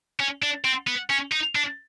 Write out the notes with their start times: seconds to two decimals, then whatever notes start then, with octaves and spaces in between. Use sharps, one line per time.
0.20 C#4
0.43 D4
0.65 C4
0.87 B3
1.10 C#4
1.32 D#4
1.55 D4